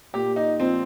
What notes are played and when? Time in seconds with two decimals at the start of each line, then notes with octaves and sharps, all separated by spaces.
0.14 A#2 G4
0.36 D#4
0.60 F3 C4